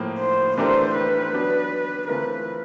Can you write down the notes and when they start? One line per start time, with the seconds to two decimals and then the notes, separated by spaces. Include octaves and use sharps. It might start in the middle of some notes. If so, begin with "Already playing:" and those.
Already playing: A2 F3 A#3
0.19 C5
0.57 E3 A3 D4 G4 A#4 C5
0.94 B4
1.33 F#3 B3 D4
2.08 E3 A3 C4 F4 A#4 B4